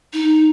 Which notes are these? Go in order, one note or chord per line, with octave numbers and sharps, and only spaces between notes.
D#4